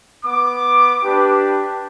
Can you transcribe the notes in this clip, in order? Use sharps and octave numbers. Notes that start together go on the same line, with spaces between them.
B3 D6
D4 G4 B4